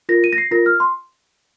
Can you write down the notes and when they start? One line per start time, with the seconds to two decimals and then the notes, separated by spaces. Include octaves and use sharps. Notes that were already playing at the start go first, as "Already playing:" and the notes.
0.09 F4 A#4 A#6
0.24 D#7
0.33 A#6
0.38 C7
0.51 F4 A#4 A#6
0.66 F6
0.80 C6